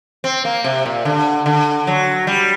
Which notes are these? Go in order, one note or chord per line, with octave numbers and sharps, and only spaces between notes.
C4
A#3
C3
A#2
D3
D3
F#3
G3